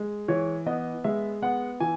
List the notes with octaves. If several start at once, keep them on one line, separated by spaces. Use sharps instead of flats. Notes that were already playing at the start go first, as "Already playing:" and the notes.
Already playing: G#3
E3 C#5
B3 D#5
G#3 E5
B3 F#5
E3 G#5